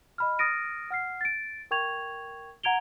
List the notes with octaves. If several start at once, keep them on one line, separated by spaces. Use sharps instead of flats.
D#5 B5 F6
D#6 F6 A6 A#6 D7 D#7
F#5 F6 C7
A6 D7
A#4 G5 C#6 G#6 F7
F#5 A#5 G#6 D7 F7 G7